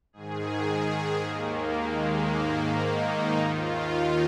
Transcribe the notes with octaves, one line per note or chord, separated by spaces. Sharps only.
G#2 D#3 G#4
D#2 D#3 A#3
G#3
G#2 D#3 A#3
D#4
D#2 D#3 F4
D#4